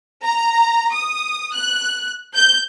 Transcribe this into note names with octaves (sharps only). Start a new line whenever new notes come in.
A#5
D#6
F#6
G6